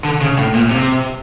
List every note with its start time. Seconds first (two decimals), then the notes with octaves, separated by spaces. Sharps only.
0.05 D3
0.21 C#3
0.38 A2
0.55 A#2
0.71 C3